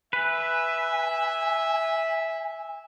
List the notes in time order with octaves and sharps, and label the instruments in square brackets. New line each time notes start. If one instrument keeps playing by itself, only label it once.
[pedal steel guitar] B4 [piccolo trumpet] E5 [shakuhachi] G#5